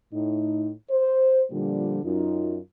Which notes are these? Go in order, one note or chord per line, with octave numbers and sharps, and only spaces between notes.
A2 D#4
C5
A#2 D3 F3 G3
F#2 D#4 F4